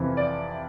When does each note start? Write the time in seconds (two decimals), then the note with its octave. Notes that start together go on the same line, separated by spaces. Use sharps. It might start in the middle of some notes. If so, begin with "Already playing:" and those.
Already playing: F2 C3 E3
0.17 D5